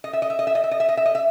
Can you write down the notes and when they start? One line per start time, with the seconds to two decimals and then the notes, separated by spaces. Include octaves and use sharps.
0.04 D#5
0.13 E5
0.22 D#5
0.30 E5
0.39 D#5
0.47 E5
0.55 D#5
0.64 E5
0.71 D#5
0.80 E5
0.89 D#5
0.97 E5
1.06 D#5
1.15 E5